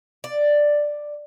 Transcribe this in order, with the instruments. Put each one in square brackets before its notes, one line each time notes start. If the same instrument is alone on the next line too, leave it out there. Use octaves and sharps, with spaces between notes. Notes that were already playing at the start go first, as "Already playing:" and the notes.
[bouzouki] D5